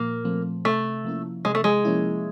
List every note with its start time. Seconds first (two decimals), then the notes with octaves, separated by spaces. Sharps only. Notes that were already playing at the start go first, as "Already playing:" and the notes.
Already playing: A#2 F3 A#3
0.25 F3 A3 C4
0.65 C3 A3
1.05 F3 A#3 C#4 E4
1.45 C3 G#3
1.55 A3
1.64 G#3
1.85 F3 A#3 C#4 E4